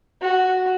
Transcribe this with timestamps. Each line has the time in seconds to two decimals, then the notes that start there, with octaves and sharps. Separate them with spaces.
0.22 F#4